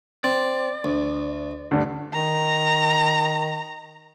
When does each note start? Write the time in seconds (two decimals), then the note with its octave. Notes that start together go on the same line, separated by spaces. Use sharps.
0.24 C4 D5
0.84 D2
1.71 D2 G2
2.13 D#3 A#5